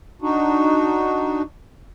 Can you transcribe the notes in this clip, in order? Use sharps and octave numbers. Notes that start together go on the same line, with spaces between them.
D4 D#4 F#4